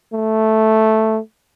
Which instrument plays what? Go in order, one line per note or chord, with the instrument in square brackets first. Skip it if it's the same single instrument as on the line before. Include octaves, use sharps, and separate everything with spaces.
[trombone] A3